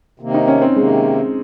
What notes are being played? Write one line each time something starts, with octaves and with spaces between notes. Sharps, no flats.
C3 D#3 A#3
D#4
C#4
C4
C3 D#3 G#3 A#3